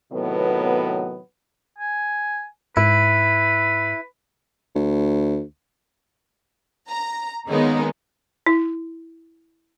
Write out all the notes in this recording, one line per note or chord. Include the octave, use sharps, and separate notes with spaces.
A2 C3 D#3 F#3 B3
G#5
G#2 E4 B4
D2
A#5
D#3 G#3 A#3 B3 C#4 D#4
E4